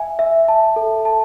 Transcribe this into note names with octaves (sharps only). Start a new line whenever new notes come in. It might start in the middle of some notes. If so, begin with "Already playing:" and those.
Already playing: E5 G#5
E5
A5
A4
A5